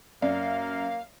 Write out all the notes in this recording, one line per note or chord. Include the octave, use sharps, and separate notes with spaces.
F#2 A#3 D5 F5